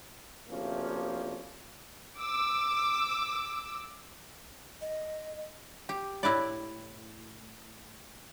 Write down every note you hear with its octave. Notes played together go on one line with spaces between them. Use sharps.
D2 C3 F3 A#3 C#4
D6 E6
D#5
G4
A2 E4 B4 D5